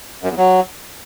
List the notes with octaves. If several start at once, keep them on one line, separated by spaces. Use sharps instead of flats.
F#2
E2
F#3